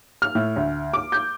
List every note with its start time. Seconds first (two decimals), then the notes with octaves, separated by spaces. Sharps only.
0.22 F6
0.35 A2
0.56 D2
0.93 D6
1.12 G6